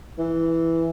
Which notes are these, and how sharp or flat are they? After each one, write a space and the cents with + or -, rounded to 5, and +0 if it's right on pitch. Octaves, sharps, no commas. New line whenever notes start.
E3 +0